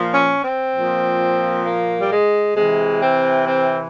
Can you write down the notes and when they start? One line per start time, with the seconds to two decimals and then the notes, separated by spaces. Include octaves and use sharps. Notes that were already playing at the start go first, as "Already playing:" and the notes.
Already playing: A#2 F3
0.13 C#4
0.43 C4
0.74 A#2 F3
1.65 A#3
1.99 G3
2.10 G#3
2.55 C3 E3 G#3
3.01 C4
3.46 C4